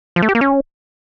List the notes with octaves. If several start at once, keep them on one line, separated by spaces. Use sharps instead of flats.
F3
A3
G4
A#3
C#4